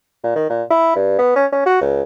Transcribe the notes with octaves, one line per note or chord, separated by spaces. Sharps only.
A#2
D#3
A#2
E4
G2
B3
C#4
C#4
F#4
C#2